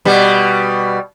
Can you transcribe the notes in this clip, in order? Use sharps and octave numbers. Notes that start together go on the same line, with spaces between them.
B2 G3